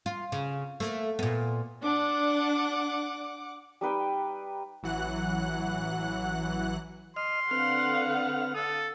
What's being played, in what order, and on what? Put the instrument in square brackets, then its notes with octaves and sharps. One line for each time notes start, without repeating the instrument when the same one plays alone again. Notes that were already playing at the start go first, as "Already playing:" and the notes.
[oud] F4
C#3
A3 A#3
A#2 B3
[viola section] D4 [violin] F#5 D6
[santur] G3 D#4 B4 G5
[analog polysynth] A1 E3 F#3 F#5 F#6
[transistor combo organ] D#5 F6 [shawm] C6
[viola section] D3 F5 F#5 [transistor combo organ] C4 B4 F6
[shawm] A4 [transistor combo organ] D#6